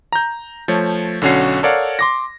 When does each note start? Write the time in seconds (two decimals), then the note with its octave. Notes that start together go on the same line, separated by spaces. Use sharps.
0.12 A#5 G6
0.68 F3 A3 C#5
1.21 B1 D3 C#4 F#4 C7
1.63 A4 A#4 C#5 D5 F5 F#5
1.99 C6 D6 A#6